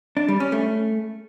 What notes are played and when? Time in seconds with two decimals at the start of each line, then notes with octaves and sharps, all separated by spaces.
0.17 D4
0.28 G3
0.40 C#4
0.52 A3